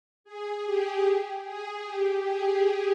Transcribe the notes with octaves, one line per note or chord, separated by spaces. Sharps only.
G#4
G4
G#4
G4
G#4